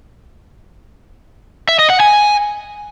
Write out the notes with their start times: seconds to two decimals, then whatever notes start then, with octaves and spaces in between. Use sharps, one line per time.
1.69 E5
1.79 D#5
1.90 F#5
2.00 G#5